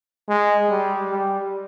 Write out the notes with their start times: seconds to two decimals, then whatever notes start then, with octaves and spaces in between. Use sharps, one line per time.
0.29 G#3
0.70 G3
1.10 G3